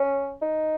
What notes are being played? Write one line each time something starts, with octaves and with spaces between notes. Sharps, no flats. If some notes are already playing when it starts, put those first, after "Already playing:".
Already playing: C#4
D#4